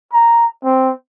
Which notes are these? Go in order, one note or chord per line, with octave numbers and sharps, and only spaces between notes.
A#5
C4